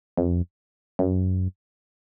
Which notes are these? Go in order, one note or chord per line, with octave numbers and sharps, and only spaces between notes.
F2
F#2